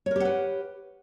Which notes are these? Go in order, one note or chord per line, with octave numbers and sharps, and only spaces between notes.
G4 A#4 B4 C#5 F#5